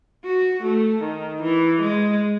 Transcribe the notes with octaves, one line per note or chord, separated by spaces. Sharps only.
F#4
A3
D#3
E3
G#3